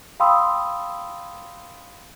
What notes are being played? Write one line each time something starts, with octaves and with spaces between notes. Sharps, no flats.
F5 G5 B5 C6 D#6 E6